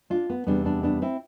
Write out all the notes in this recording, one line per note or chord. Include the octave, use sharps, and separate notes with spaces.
D4 F4
B3
E2 C3 G3 B3 D4
B3 D4
B3 D4
C4 E4